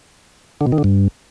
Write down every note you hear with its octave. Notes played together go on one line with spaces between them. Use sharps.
D3
B2
D#3
D3
G2